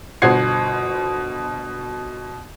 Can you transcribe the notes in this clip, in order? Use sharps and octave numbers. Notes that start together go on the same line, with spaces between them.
G1 B2 C5 F#5 G#6 C7